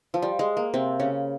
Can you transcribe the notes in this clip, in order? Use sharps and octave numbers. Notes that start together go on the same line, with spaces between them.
F3
G3
G#3
A#3
C3 C4
C#3 C#4